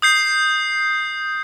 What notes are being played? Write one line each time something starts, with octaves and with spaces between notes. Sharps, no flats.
D#6 G6 C7